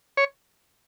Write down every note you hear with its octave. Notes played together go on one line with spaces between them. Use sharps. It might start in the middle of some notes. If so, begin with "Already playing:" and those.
C#5